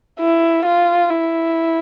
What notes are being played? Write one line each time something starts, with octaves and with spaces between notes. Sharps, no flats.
E4
F4
E4